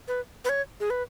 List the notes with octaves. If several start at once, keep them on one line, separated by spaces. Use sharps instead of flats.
B4
B4
C#5
G#4
B4